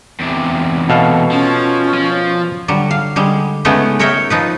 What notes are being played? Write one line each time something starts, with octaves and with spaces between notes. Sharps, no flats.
E2 C3
B2 A4 F5
F3 C#4
F3
D3 F#3 G3
F5
D3 G3 G#3
C#3 G#3 A3 B3 C#4 D#4
D#4 A#4 C#5 E5 G5
F3 D#4 B4